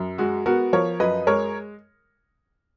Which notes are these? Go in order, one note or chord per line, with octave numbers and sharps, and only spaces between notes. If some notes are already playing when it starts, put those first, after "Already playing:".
Already playing: F#2
G#3 F#4
B3 F#4 A#4
F3 A#4 C#5
F#2 B4 D#5
G#3 A#4 C#5